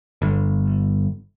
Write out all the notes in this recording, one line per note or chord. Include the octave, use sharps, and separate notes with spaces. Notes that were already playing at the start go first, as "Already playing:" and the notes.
G1